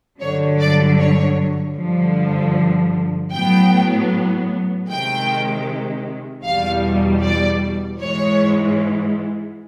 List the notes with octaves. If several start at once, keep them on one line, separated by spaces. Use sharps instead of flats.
G2 D3 F#3 C#5
D5
C#5
G2 D3 F3
A2 F#3 B3 G5
C3 D#3 G#3 G5
E2 B2 G3 F5
D5
G#2 E3 G#3 C#5